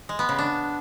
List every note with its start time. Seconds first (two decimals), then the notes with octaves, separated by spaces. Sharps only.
0.09 G#3
0.19 B3
0.29 C#3
0.39 D4